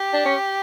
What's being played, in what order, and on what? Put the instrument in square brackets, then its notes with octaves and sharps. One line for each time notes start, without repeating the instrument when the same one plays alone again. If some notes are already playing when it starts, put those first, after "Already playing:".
Already playing: [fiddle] G4
[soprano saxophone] D4
C#4